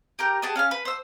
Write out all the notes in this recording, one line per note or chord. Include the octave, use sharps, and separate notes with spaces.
G4 A#4 G6
B3 G4 G#4 A5
C#4 F5 A5 F6
B4
C5 E6